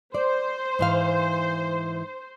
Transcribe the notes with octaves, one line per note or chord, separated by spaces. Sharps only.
C5 D5
G#2 E3 F5